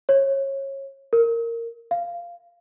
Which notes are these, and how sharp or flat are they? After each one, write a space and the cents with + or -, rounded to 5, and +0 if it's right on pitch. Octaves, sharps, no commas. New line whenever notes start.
C#5 -25
A#4 -10
F5 -10